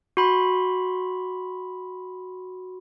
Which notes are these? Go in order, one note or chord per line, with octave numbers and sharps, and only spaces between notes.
F#4 B5 C6